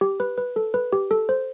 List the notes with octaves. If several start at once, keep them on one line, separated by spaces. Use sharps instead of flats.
G4
B4
B4
A4
B4
G4
A4
C5